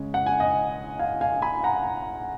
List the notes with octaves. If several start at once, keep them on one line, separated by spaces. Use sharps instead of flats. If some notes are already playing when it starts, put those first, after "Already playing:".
Already playing: C#3 G#3 C#4
F#5
G#5
D#5 F#5
F5 G#5
F5 G#5
G#5 B5
F#5 A#5